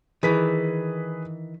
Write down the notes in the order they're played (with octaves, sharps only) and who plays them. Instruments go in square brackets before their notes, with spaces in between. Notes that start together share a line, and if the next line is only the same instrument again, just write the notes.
[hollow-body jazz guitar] D#3 E3 [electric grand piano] G#4 B4 B6